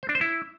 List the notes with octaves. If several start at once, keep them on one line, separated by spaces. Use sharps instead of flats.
C5
D4
C5
E4